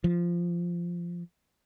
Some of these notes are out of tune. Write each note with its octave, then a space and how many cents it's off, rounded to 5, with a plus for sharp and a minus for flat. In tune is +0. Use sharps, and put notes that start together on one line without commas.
F3 -10